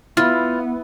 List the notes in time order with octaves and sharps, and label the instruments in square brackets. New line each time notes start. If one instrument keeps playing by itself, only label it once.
[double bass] B3 [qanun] E4 [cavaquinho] F4